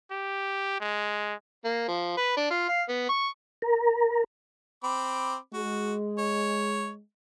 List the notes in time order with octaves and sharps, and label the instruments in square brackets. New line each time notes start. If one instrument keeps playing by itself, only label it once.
[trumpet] G4
G#3
[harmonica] A#3
F3
B4
D4
F4
F5
B3
C#6
[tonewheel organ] A#4
[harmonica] C4 B5 D6
[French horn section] G#3 [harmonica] F#4
[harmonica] C#5